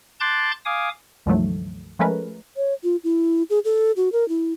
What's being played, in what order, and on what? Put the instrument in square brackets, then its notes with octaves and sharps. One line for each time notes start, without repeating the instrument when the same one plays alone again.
[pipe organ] A5 C6 D6 F#6 G6 A6
F5 G#5 D6 D#6
[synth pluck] C#2 G2 D#3 F3 F#3 A3
F3 G#3 A3 C#4 A#4 B4
[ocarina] C#5
F4
E4
G#4
A4
F#4
A#4
E4